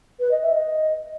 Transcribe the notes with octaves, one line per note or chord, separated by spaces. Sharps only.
B4
D#5
E5
D#5